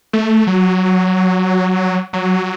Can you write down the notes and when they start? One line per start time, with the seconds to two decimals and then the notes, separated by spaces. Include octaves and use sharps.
0.13 A3
0.47 F#3
2.13 F#3